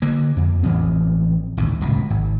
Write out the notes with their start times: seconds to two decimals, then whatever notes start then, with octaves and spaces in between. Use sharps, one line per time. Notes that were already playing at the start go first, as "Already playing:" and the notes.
0.02 D3 A#3
0.37 F2
0.63 A1 E3 F3 C4
1.57 A#1 D#2 G#2
1.81 D1 C#2 B2
2.10 G#1